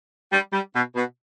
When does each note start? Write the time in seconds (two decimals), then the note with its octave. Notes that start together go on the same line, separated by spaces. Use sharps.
0.32 G3
0.53 G3
0.74 B2
0.95 B2